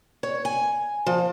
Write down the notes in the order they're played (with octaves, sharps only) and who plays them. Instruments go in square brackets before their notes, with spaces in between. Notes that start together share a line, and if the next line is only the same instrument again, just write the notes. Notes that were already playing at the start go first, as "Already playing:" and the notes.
[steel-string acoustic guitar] C#5
G#5
F3